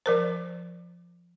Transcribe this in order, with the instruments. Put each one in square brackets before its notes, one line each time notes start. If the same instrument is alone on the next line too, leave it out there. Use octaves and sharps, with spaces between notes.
[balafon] F3 A#4 C5